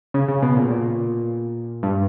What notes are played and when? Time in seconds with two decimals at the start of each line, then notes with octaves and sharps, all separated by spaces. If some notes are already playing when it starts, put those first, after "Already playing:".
0.14 C#3
0.28 C#3
0.42 B2
0.57 A#2
0.71 A#2
1.83 G2